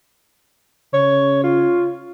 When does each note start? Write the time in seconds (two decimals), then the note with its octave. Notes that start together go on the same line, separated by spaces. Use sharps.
0.94 C#3 C#5
1.43 F4